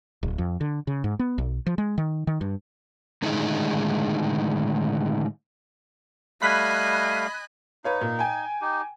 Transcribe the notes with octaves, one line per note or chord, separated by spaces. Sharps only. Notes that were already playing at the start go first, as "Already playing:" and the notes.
D1
F2
D3
C#3
G#2
B3
B1
F3
G#3
D#3
D#3
G2
A2 D3 D#3 G#3 D#4 E4
G3 A3 D#5 F5 G#5 B5 F#6 B6
D#4 B4 C#5 F5
A#2
G5 G#5
D#4 G4